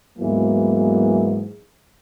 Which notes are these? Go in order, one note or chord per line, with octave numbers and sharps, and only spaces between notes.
D2 G#2 E3 F#3 A#3 B3